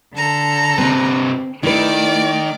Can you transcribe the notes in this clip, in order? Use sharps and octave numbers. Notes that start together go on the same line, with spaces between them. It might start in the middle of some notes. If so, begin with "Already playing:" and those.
D3 A4 A#5
C3 C4 B4
D#3 A3 E4 B4 D5 D6